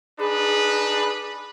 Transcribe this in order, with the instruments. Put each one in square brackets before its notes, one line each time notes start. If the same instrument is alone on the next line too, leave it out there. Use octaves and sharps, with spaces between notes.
[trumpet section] D4 D#4 B4 [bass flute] G#4